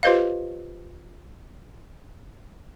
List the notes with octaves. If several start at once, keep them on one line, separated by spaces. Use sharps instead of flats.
F4 G4 B4 C5 D#5 F5